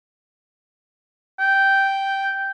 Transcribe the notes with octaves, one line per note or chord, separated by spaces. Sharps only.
G5